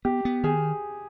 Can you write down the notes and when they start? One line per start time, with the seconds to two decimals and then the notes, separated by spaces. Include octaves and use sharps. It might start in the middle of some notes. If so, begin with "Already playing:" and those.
0.05 B3 G4
0.25 B3
0.43 D#3 G#4